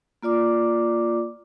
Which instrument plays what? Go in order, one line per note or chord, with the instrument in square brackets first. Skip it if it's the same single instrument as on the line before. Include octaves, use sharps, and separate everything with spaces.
[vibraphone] A#3 F4 D5 D6